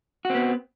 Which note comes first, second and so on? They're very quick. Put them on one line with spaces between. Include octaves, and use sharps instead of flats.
F#4 C4 B3